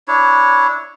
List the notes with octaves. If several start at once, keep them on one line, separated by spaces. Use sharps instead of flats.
D4 E4 C#5